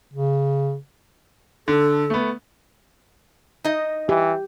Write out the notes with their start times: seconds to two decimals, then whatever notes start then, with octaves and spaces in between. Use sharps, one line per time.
0.13 C#3
1.68 D3 A4
2.10 A3 B3
3.64 D#4 D#5
4.09 E3 G4